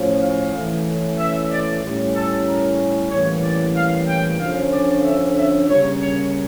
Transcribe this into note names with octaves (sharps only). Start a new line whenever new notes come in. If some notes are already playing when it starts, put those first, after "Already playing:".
Already playing: A2 F3 C#4
F5
E3 A3 C#4
E5
D5
A2 G3 C#4
A4
A#4
A2 E3 G3 A#3 C#4 C#5
D5
F5
G5
D3 F3 C#4 F5
D5
E5
E5
C#3 G3 A#3 C#4 C#5
C#5